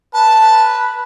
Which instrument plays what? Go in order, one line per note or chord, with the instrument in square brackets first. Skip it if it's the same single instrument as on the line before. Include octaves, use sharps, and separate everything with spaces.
[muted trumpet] B4 [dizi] A5